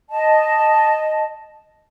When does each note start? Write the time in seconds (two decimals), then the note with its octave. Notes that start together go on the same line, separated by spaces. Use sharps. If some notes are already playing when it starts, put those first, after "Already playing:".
0.10 D#5 A5